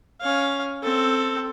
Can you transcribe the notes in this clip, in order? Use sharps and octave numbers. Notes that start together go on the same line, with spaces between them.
C#4 F5
C4 A4